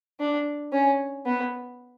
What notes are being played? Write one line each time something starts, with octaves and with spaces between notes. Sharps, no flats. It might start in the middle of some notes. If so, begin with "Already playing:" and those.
D4
C#4
B3